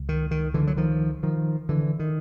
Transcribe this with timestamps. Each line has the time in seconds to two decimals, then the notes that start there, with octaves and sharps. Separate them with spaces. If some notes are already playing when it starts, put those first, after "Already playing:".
Already playing: C#2
0.09 D#3
0.31 D#3
0.54 D3 E3
0.67 F#3
0.77 D#3 F3
1.23 D#3 F3
1.69 D3 E3
1.99 D#3